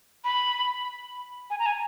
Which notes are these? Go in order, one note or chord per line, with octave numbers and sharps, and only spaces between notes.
B5
G#5
A#5
G#5